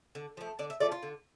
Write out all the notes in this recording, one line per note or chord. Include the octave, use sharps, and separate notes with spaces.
D3
F3 A3
D3 D5
E5
F3 A3 D5
F4
D3